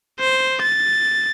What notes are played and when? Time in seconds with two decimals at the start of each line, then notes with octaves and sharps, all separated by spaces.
0.20 C5
0.62 A6